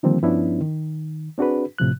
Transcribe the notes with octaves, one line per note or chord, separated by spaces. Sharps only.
D3 D#3 F3 G3 A#3 C4
G2 F3 B3 C#4 D4 E4
D#3
C4 D4 F#4 G#4 B4
A2 C3 F3 F#6